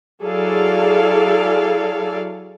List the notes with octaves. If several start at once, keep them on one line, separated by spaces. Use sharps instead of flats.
F#3 E4 G#4 A4 D5 F5